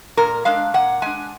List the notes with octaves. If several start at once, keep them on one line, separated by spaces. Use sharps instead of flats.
A#2 A#4
G#3 D4 F5
A#2 F#5
G#3 D4 G#5